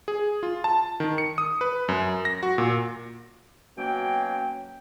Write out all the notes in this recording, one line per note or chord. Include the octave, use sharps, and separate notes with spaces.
G#4
F4
A5
D#3
C#7
D#6
B4
F#2
A#6
F#4
A#2
B2 F#3 A#3 C#4 G5